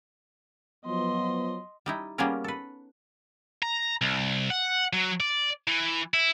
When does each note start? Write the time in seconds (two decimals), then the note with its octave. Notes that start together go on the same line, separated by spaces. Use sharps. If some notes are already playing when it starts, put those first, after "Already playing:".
0.86 F3 F#3 B3 D#5 C6
1.86 G3 D#4 E4
2.18 G3 A#3 B3 C#4 G#4 A#4
2.44 A4 B4
3.63 A#5
4.01 C2
4.50 F#5
4.93 F#3
5.20 D5
5.68 E3
6.14 E4